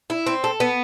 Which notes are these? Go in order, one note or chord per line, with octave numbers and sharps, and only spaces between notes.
E4
C4
A4
B3